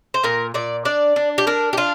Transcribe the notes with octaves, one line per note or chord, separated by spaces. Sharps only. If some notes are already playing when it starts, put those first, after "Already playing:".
C5
A#2 A#4
A#2 D5
D4 D5
D4
G4
D4 A#4
G4
D4 F4